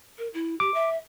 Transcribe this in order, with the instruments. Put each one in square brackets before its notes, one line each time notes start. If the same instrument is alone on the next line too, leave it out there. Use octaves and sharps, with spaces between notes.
[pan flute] A#4
E4
[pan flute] G4 [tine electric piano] D6
[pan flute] E5